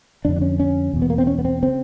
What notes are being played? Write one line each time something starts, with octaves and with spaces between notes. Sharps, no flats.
F2 D3 D4
D4
C#4
C#4
E2 B2
B3
A#3
C4
C#4
B3
C4
C#3 C4